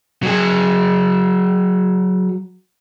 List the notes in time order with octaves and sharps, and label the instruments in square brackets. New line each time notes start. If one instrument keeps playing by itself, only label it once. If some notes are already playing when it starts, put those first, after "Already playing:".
[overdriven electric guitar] F#3 G#4